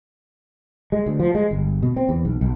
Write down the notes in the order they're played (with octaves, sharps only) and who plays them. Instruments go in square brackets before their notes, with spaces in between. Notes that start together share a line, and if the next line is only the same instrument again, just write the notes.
[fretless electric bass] G#3
D2
F3
G#3
G1
B2
C4
E2
B1
B1